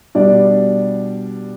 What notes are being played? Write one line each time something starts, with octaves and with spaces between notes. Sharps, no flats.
B2 G3 D4 D5